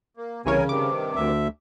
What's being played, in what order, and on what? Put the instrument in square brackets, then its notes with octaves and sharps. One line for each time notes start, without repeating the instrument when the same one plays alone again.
[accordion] A#3
[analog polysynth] C2 E3 C#5 [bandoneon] C#3 [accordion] A#4 G#5
[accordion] G2 C3 D#3 [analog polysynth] D6
[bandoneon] D2 E5